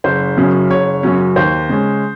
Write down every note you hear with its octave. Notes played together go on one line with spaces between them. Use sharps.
F#1 C5
F#2 C#3 F#3 C#4
F#1 C#5
F#2 C#3 F#3 C#4
D#2 C5
C#3 G#3 C#4